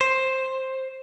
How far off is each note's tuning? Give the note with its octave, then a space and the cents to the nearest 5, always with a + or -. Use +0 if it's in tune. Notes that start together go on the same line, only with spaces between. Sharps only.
C5 +10